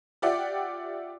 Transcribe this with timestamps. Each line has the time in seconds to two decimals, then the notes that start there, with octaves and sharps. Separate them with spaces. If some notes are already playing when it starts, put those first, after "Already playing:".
0.22 F4 G4 D5 E5 F#5 G5